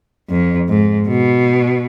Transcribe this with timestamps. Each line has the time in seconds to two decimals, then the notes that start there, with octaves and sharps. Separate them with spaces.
0.29 F2
0.69 G#2
1.07 B2